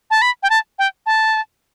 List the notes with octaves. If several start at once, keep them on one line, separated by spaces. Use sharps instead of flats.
A5
B5
G5
A5
G5
A5